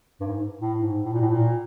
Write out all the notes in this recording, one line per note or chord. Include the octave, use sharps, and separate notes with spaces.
G2
G#2
A2
G#2
A2
A#2
A2
A#2